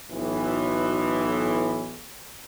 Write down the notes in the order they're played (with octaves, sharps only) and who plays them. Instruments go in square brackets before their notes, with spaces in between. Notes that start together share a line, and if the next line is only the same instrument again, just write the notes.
[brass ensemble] B1 A2 E3